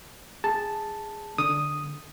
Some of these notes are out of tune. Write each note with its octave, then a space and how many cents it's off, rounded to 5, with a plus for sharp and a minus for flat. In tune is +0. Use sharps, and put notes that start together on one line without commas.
G#4 -15 A5 +0
D3 +0 D#6 +0